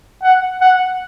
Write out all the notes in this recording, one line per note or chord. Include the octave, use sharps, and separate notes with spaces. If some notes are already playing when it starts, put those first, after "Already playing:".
F#5
F#5